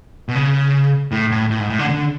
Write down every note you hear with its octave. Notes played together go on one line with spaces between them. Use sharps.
B2
C#3
A2
A2
A2
G#2
A2
D3
D3